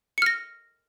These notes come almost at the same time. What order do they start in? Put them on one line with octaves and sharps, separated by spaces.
C#7 F6 A#6